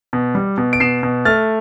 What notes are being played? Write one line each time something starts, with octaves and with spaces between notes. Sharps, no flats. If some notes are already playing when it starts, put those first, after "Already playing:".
B2
G3
B2
D7
B2 C7 E7
B2
A3 F6 A6